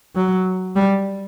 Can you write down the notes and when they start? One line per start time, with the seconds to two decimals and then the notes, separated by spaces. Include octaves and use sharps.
0.15 F#3
0.76 G3